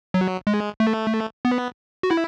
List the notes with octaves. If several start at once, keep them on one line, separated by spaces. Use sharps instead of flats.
F#3
G#3
A3
B3
F#4
E4